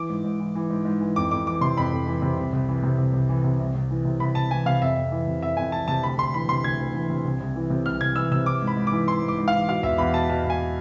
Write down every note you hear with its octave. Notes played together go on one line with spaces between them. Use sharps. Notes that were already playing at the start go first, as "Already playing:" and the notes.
Already playing: E3 D6
G#2
G#2
E3
E3
G#2
G#2
E3
F2 D6
F2 D6
E3 D6
C3 C6
F2 B5
F2
E3
C3
C2
C2
E3
C3
C2
C2
E3
C3
C2
C2
E3
C3
C2 B5
C2 A5
E3 G#5
C3 F5
F2 E5
F2
E3
C3
F2 E5
F2 G#5
E3 A5
C3 A5
D2 B5
D2 C6
E3 B5
C3 C6
D2 G#6
D2
E3
C3
C2
C2
E3
C3
C2 F6
C2 G#6
E3 E6
C3 E6
E3 D6
G#2
B5
G#2
D6
E3
E3 C6
G#2
D6
G#2
F5
E3
B2 F5
E2 E5
E2 B5
B2 A5
B2 A5
E2
G#5